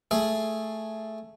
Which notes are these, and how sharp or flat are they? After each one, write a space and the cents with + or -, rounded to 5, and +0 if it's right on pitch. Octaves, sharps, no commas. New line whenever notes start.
A3 +0 G#4 +5